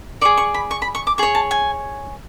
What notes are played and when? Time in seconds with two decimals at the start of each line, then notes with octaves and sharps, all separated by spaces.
0.21 D5 C#6
0.25 G#4
0.37 C#6
0.54 B5
0.71 C#6
0.82 B5
0.95 C#6
1.07 D6
1.18 G#4 C#5 C#6
1.35 A5
1.51 G#5